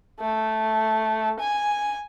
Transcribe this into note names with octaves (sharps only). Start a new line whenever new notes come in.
A3
G#5